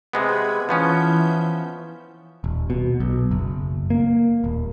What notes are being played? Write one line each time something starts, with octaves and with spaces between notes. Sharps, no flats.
C3 G#3 B3 G#4 G#5 B5
E3 F3 B3 C#4 E5 G6
D#1
B2
B1
F#1
A#3
D#1